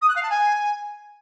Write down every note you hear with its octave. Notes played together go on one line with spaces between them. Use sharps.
D#6
F#6
F5
A5
G#5